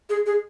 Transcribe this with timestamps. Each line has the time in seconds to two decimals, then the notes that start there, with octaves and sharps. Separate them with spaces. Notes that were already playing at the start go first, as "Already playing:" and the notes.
0.09 G#4
0.26 G#4